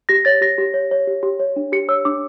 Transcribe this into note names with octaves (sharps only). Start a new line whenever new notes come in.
G4 A#6
C#5 A6
G4 A#6
G4
C#5
C#5
G4
G4
C#5
D4
G4 C#7
C#5 E6
D4 D6